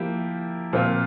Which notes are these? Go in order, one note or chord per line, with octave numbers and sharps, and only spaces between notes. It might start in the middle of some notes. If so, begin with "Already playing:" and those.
Already playing: F3 A#3 E4 G4
A#2 F3 C4 F4